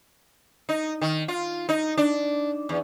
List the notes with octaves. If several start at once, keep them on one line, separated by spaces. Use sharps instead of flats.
D#4
D#3
F4
D#4
D4
E2